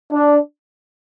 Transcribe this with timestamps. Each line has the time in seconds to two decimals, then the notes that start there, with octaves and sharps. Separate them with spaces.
0.12 D4